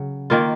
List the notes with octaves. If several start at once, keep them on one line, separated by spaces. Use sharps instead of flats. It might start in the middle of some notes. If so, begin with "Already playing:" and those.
Already playing: C#3 F#3
D#3 A#3 F4